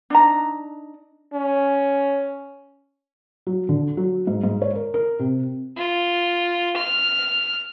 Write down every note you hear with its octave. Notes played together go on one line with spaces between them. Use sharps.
D4 D#4 A#5
C#4
F#3
D3
F#3
G#2
G#2
C#5
A#4
A#4
C3
F4
F6